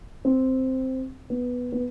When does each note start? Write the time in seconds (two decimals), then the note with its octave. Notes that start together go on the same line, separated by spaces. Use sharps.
0.25 C4
1.30 B3
1.72 B3